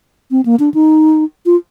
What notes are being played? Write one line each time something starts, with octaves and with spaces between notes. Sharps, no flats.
C4
A#3
D4
D#4
F4